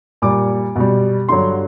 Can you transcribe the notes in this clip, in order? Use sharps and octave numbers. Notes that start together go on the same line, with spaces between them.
A#2 G3 D6
B2 G3
G2 D3 F#3 C6